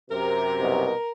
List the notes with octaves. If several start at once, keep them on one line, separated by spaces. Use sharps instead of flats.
F#2 C3 A#4
C2 B2